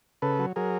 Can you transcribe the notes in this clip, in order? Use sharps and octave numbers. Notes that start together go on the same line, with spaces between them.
C#3 A4 B4
F#3
F#3 G#4 A#4